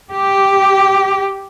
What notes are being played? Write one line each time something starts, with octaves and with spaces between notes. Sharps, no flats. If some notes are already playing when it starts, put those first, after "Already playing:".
G4